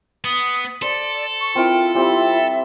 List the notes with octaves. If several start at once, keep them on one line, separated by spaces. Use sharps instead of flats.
B3 D#6
A4 C5 D5
C#6
C4 E4 F4 A#4
G3 C4 E5